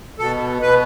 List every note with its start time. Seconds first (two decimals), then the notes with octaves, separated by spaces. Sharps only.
0.19 B2 A4
0.62 B2 B4